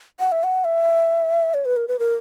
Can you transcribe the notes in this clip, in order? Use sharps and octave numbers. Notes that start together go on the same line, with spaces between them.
F#5
E5
F#5
E5
C#5
B4
A#4
B4
A#4